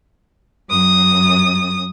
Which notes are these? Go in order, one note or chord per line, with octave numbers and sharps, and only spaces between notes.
F#2 D#6